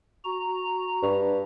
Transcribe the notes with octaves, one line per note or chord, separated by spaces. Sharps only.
F#4 A#5
G2